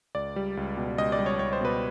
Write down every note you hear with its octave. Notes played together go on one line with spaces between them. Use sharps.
C#2 D5
G3
C#2
B2
C#2 D#5
D5
G3
C#5
C#2 C#5
C5
B2 B4